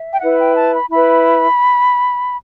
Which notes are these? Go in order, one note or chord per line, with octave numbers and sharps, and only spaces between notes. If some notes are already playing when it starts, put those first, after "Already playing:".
Already playing: E5
G5
E4 B4 F#5
G5
A5
B5
E4 B4 B5